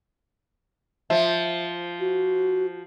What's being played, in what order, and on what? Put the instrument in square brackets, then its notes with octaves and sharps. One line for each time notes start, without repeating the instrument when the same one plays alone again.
[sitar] F3 [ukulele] E5
[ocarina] F#4